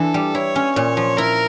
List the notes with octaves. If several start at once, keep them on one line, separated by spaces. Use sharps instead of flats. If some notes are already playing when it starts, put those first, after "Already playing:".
Already playing: E3 D4 A4
G3
E4 C#5
C#4
A#2 C#5
F3
E4 A#4